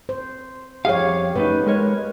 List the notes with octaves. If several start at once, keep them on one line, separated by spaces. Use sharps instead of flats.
C5
F2 G4 G#4 C#5 F5
F#2 A3 D#4 B4
G#3 A#4 C#5